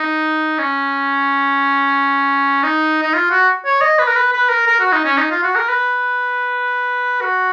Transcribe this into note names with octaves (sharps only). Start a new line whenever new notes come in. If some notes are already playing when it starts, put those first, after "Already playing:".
Already playing: D#4
C#4
D#4
D#4
F4
F#4
C#5
D#5
B4
A#4
B4
B4
A#4
A#4
F#4
D#4
C#4
D#4
F4
F#4
A#4
B4
F#4